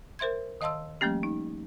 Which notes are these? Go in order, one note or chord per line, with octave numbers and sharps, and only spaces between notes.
A#4 C5 E5 C6 G#6
D#3 D#5 F5 A5 C6 E6
F3 G3 A3 A#3 C#4 G4
D#4